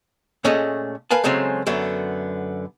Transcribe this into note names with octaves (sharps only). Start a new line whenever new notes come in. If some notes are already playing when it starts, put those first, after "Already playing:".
A#2 A3 C#4 G#4 A4 D#5
A#4 B4 F5 G#5 A5
C#3 F#3 G#3 A3 C4 C#4
F#2 D3 A3 B3